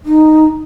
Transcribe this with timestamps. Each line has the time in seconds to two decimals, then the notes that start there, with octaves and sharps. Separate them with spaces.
0.06 D#4